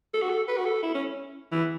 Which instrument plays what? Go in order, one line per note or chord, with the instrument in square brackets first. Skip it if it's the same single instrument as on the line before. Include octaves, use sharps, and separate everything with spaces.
[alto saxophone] A4
F#4
A4
B4
F#4
A4
E4
C#4
E3